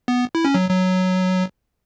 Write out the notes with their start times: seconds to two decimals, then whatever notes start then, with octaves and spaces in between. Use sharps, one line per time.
0.08 B3
0.35 E4
0.45 C#4
0.54 F#3
0.70 F#3